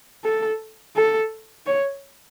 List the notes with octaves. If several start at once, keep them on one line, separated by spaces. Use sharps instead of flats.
A4
A4
C#5